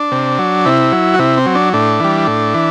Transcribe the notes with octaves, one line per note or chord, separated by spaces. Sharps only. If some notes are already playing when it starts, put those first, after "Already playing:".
Already playing: D4
C3
F#3
C3 E4
F#3
F#4
C3 E4
C4
F#3
D4
A2 D4
E3 G3
A2
E3